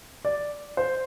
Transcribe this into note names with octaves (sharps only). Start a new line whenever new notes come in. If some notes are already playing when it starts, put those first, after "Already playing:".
D5
C5